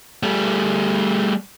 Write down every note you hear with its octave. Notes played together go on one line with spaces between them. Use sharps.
G3 A3